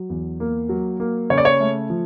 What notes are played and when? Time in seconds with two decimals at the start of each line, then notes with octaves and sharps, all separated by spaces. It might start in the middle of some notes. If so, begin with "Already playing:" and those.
Already playing: F#3
0.10 E2
0.40 A#3
0.69 F#3
1.00 A#3
1.30 C#3 C#5
1.38 D5
1.45 C#5
1.60 A3
1.90 F3